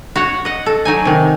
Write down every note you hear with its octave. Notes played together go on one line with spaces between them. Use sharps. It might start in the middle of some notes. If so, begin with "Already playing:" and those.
F#4 C#5 F#5
D#5 F#5
A4
F#3 D#4 G#5
C3 D#3